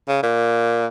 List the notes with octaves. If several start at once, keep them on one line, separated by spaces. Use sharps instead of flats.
C#3
A#2